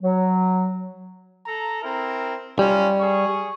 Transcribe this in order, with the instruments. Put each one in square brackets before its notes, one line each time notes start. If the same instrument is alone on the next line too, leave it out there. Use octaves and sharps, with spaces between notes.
[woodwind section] F#3
[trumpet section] A4 A#5
C4 E4 A#4
[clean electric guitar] G3 [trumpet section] C#4 D#4 F4
[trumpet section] G#4 C#6